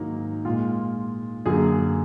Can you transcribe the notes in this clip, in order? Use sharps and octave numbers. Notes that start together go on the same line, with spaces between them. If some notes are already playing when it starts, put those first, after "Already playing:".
Already playing: G#2 D#3 F#3 A#3 D#4
A#2 G#3 F4
F#2 D3 F#3 A#3 G#4